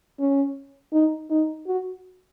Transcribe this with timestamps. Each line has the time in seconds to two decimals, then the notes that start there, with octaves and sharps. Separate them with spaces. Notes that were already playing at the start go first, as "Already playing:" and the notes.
0.20 C#4
0.93 D#4
1.31 D#4
1.68 F#4